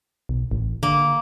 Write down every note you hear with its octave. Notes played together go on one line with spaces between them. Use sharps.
B1
A1
D3 A#3